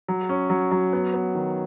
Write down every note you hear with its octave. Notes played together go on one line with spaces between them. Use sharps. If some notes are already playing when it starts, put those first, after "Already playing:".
F#3
C#4
F#3
F#3
B3
B3
D#3